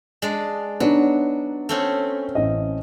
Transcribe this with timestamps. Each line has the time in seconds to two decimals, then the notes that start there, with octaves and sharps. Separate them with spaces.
0.22 G#3 D4
0.80 F#3 B3 D4 D#4
1.69 A3 C4 C#4
2.35 A1 D#5